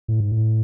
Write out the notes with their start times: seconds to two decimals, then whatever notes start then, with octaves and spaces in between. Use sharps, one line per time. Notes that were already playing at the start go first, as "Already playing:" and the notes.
0.08 A2
0.20 G#2
0.32 A2